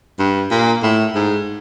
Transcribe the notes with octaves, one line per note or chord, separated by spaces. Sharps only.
G2
A#2
A2
G#2